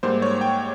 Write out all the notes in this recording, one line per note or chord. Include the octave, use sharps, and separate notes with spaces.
G#2 G3 A#3 C5
C#5
G5